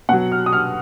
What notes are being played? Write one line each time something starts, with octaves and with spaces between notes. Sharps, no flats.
B2 F#3 F#5
F6
D#6
F6